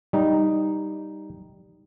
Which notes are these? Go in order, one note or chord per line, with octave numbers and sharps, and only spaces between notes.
G3 D#4